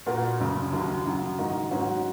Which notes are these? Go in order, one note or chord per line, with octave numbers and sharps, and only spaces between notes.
A#2 A#3 F#4 A#4
F#1 F#2 C#3
D#2 D#3 F#3
F#2 C#3 F#3
G#2 D#3 A#3 D#4 F#4
G#2 F#3 C#4 F#4